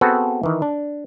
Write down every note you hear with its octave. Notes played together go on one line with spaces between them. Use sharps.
B3 C4 F#4 G#4 A4 B4
D#3 E3
D4